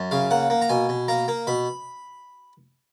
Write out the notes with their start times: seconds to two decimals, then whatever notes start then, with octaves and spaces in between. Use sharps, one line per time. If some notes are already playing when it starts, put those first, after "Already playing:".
Already playing: F#2
0.11 C#3 F5
0.31 A#3 F#5
0.50 A#3
0.62 A#5
0.69 B2 G#5
0.89 B2
1.08 A#3 A#5
1.28 A#3
1.47 B2 B5